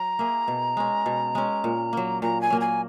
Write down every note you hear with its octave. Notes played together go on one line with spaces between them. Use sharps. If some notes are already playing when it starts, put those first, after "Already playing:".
Already playing: F#3 A#5
A#3 E4 G#4
B2
G#3 C#4
B2
G#3 C#4
A#2
F#3 A#3
A#2 A#5
G#5
F#3 A#3
G#5